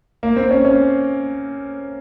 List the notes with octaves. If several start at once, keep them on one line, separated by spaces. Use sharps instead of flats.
A#3
C4
C#4
C#4